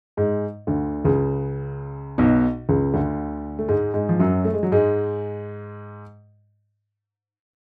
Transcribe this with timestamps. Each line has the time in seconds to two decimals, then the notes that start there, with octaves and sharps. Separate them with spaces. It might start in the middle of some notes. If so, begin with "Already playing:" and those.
0.17 G#2 G#3
0.67 D2 D3
1.05 C#2 C#3
2.18 B1 B2
2.69 C#2 C#3
2.93 D2 D3
3.59 A3
3.69 G#2 G#3
3.94 G#2 G#3
4.09 F3
4.19 F#2 F#3
4.44 A3
4.54 G#3
4.63 F#3
4.72 G#2 G#3